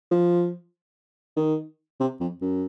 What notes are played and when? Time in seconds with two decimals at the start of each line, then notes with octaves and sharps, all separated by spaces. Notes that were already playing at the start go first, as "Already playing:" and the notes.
0.11 F3
1.37 D#3
2.00 C3
2.21 F2
2.42 F#2